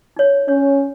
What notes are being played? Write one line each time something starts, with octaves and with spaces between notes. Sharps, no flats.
D#4 C#5
C#4 C#5